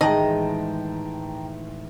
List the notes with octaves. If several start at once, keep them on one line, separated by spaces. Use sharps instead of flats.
A1 D#3 G#3 D#5 G5 A5 A#5